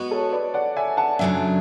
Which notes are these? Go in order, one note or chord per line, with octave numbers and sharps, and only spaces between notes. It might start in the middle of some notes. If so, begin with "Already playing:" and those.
Already playing: G#3 B3 F#4
A4 C#5
B4 D5
D5 F#5
E5 G#5
F#5 A5
F#2 C#3 F#3 A3 D4 E5 G#5